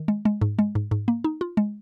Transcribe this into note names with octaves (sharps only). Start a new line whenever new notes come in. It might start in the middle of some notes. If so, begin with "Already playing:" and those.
Already playing: D#3
G#3
G#3
G#2
G#3
G#2
G#2
A#3
D#4
F4
G#3